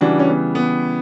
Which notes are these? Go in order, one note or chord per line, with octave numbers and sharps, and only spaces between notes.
C#3 E3 G3 D4 F#4
C#4
B3
B3